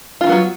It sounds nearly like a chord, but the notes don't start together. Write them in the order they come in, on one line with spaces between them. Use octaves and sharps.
F4 E3 D#3 B3 F#3